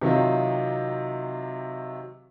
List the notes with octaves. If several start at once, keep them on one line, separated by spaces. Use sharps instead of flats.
C3 D#3 F#3 D#4 F4